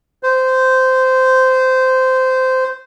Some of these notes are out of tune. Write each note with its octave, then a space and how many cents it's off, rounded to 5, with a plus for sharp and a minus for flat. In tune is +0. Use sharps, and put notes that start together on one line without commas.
C5 -15